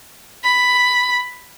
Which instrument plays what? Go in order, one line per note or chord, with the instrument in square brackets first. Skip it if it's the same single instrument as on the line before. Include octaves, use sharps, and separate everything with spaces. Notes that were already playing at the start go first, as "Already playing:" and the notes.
[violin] B5